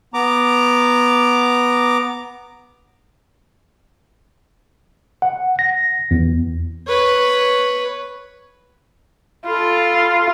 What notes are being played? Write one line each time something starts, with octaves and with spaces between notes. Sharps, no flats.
B3 A#5 D6
F#5
A#6
E2
B4 C#5
F4 A4 B5